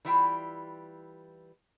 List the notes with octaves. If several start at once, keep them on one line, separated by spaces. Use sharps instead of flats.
E3 G3 E4 F4 G5